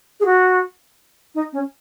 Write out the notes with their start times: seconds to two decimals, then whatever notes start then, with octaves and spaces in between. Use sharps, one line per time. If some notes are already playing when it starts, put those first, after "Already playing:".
0.20 G#4
0.25 F#4
1.35 D#4
1.53 C#4